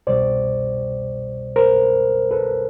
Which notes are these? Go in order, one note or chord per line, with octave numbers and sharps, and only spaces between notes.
C2 B2 G3 C5 D5
A#4 C5
A4 B4